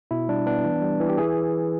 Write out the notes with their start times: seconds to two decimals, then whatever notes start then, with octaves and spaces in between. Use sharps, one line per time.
0.11 B2 E4
0.28 G3 D4
0.46 B3 D4
0.64 E3
0.82 G3
1.00 E3
1.09 G4
1.18 E3 G#4